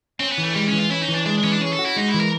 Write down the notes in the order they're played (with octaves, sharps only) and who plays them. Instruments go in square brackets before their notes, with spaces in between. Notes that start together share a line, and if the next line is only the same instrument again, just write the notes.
[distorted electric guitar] C4 [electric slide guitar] C#4
[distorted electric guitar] B3
[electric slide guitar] E3
[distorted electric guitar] A3
[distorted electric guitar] G3 [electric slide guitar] G#3
[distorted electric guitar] C#4
[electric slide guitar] E3
[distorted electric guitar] F4
[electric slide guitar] C#4 [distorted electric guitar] E4
[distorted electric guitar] D#4
[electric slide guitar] E3
[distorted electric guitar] D4
[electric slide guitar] G#3 [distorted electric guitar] D4
[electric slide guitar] E3 [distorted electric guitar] C#4
[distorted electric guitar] D4
[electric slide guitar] C#4 [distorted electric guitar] G#4
[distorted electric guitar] A4
[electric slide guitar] F#4
[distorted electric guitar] E4
[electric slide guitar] G#3 [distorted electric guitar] D#4
[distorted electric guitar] E4
[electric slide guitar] E3
[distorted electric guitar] A#4